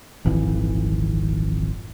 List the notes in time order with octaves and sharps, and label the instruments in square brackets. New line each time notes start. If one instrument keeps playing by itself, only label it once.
[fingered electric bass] D#1 G#1 F2 E3